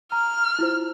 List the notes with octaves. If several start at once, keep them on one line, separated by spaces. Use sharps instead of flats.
A#5 F6
E4 F4 C5